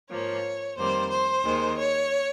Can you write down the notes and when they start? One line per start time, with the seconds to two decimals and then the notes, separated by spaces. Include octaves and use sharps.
0.10 G#2 F3 A#3 C#5
0.77 F2 D#3 G3 A#3 C5
1.11 C5
1.44 D#2 D#3 G#3
1.77 C#5